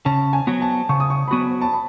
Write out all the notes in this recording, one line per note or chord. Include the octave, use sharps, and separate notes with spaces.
C#3 A5
G#5
F#3 B3 F#4
A5
C#3 C#6
D#6
C#6
B5
F#3 B3 F#4 C#6
A5
B5